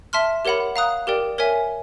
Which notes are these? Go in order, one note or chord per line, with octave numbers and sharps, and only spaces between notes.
E5 A5 C6 F6
G4 A#4 C#5 F#5 B5
F5 A#5 D#6 F#6
G4 A#4 D5 G5
A#4 C#5 E5 G#5